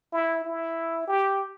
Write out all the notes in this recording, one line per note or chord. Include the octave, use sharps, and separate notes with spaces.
E4
E4
G4